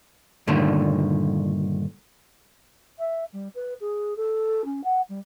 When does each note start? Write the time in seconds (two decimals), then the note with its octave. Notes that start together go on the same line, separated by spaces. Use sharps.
0.47 G2 A#2 D3 D#3 A3
2.99 E5
3.33 G3
3.55 B4
3.81 G#4
4.17 A4
4.65 C#4
4.84 F#5
5.09 G3